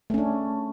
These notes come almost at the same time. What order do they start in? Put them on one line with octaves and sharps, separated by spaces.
A3 C#4 D4